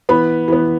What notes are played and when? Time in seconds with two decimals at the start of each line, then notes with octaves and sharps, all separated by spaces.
0.09 E3 B3 B5
0.48 E3 B3